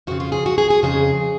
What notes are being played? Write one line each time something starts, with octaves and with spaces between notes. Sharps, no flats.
F2 C#3 F#4
F4
G#4
F#4
G#4
G#4
F2 C#3 G#4